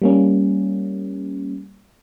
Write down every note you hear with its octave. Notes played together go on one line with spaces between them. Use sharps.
G3 A#3 C#4